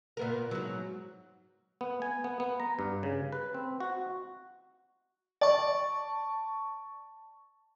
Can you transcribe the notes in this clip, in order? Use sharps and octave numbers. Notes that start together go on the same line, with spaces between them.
A#2 B3 A#4
G#2 F#3
B3
G#5
B3
B3
A#5
G2
C#3
B4
C4
F#4
D5 A5 C#6